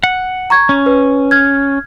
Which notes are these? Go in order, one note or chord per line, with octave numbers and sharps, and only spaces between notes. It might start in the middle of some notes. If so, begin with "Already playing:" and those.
F#5
A#5 C#6 G#6
C#4
B4
F6 G#6